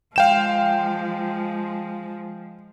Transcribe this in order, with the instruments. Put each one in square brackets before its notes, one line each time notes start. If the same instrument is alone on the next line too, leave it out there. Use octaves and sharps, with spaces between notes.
[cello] F3 G#3 [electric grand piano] F5 G5 E7